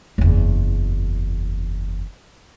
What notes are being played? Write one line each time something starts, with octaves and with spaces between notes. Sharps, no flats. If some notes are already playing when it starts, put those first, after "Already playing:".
F#1 E2